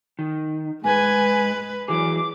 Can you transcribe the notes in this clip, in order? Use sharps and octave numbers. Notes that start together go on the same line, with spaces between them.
D#3
G#2 G#3 B4 G#5
E3 F#3 G#4 D6